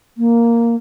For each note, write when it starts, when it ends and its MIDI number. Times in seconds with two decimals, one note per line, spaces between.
0.17 0.75 58